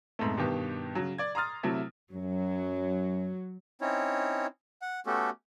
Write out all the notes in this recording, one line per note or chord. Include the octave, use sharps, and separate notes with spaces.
F2 G#2 B2 A3
G2 B2 D#3 B3 G4
C#3 F#3
D5 G#6
A#5 C6 D#6 F6 A6
C3 F#3 A3 E4
F#2 F#3
C4 C#4 D#4 E4 C#5
F#5
A3 B3 C#4 F#4 G4 A4